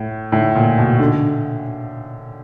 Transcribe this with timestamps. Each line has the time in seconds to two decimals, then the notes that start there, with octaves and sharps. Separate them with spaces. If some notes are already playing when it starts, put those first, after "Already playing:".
Already playing: A2
0.32 A2
0.55 A#2
0.78 B2
0.99 D3